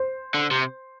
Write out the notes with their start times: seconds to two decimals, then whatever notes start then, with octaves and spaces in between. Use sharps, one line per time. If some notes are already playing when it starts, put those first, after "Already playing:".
Already playing: C5
0.34 D3
0.51 C3